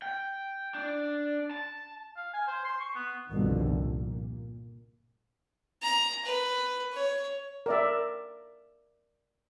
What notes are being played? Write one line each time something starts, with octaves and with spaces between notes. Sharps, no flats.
G5
D4
A5
F5
G#5
C5
C6
C#6
B3
G1 C2 B2 D3 D#3 F3
A#2
A#5
B4
C#5
A#4 D5 E5